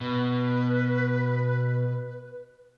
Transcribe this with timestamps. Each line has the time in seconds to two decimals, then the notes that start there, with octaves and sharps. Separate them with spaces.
0.01 B2 B4